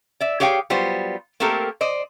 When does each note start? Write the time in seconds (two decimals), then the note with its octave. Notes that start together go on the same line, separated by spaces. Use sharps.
0.21 D5 E5
0.40 G4 G#4 C#5 F5 G5
0.70 F#3 G3 B3 F4 C5
1.40 A3 A#3 C4 G4 A4 A#4
1.81 C5 D5 D#5